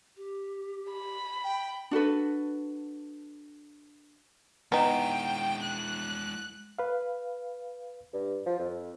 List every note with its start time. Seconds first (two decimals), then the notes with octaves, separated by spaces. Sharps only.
0.17 G4
0.92 B5
1.44 G5
1.91 D4 F#4 A4 B4
4.72 G#3 B3 D#4 E4 G5
5.63 F#6
6.79 B4 F5
8.13 G2
8.46 F3
8.59 F2